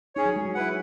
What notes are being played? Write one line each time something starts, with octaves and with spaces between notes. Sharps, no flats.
C#4 D#4 G#4 C#5
F#3
G#3
F#3
E4 B4 F#5